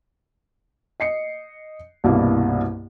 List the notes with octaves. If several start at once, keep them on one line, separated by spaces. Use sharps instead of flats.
D#5 C7 C#7
C2 G2 B2 A#3 E4